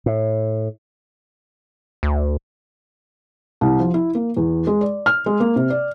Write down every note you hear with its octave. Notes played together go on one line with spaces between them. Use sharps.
A2
D2
C2
F3
E4
A#3
E2
G#3
D5
F6
G#3
A#3
C3
D5